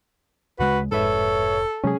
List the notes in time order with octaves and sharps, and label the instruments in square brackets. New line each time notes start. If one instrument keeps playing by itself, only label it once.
[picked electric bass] D2 C#3 G#3 [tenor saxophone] F#4 [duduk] B4
[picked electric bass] F1 [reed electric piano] G#2 B4 E5 [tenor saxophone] A4 [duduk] C#5
[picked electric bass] C3 F#3 G#3 [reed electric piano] C#4 G#4